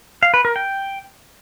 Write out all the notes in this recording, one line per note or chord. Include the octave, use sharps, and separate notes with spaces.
F5
B4
A#4
G5